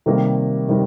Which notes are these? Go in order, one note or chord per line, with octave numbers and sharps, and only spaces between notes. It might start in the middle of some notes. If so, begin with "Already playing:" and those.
C3 D#3 G3 A#3
C3 D#3 G3